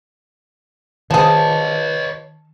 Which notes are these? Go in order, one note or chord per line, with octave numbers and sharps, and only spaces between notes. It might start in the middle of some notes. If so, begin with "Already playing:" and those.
D#3 F3 G#4 C#5 D#5 A5